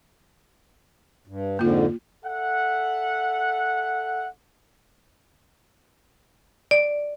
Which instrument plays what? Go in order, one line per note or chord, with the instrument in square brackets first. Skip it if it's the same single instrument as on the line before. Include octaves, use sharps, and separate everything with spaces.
[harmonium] G2
[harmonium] F2 G#2 D3 [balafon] A#3 F4
[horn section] A4 E5 F#5
[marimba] D5